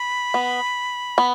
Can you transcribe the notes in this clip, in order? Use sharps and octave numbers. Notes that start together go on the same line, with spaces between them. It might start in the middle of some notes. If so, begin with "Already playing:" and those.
Already playing: B5
B3
B3